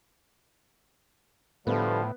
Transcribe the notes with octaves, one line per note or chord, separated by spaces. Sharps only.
A2 D3 F3 G3 A3 B3